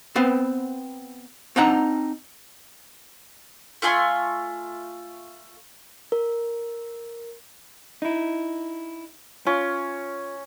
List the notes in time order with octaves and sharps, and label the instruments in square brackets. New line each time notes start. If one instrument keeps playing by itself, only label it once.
[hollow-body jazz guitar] B3 C4 B4 C5
C4 D4 D#4 F#5 A#5
[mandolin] A3 F4 G#5 C6
[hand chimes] A#4
[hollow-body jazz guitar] D#4 E4
[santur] C#4 [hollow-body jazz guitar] F4